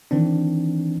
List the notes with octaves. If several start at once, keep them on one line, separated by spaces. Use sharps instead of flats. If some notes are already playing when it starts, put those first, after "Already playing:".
D#3 E3 C4 D4